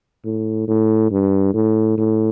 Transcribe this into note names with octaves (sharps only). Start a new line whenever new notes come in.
A2
A2
G2
A2
A2